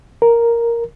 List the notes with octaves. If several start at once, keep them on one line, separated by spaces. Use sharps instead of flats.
A#4